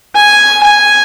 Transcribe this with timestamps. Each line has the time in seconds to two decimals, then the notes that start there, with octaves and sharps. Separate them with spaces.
0.16 G#5
0.64 G#5